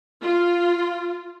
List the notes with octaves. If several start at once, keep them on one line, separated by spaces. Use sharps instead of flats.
F4